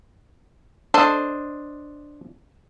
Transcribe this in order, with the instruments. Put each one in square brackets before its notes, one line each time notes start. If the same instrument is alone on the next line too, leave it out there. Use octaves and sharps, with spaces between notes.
[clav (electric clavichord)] D4 C5 D#5 [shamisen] A4